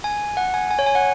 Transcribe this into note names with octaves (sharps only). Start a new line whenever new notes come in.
G#5
F#5
G#5
G#5
C#5
G#5
F#5